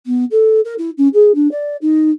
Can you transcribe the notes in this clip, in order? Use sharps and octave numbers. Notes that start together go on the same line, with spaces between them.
B3
A4
A#4
E4
C#4
G#4
D4
D5
D#4